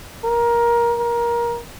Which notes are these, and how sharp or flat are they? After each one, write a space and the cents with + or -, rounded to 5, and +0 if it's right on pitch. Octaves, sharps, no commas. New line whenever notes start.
A#4 +15
A#4 +20